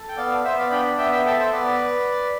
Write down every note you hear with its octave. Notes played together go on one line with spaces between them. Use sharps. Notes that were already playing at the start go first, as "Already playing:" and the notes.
Already playing: A4
G5
B3 D5 F5
B3 C5 E5
D5 F5
D4 G5 B5
B3 E5 G5
E5 G5
A4 E5 G5
C5 E5
B3 B4 D5